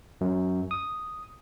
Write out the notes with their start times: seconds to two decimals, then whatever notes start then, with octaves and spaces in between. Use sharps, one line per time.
0.21 F#2
0.71 D#6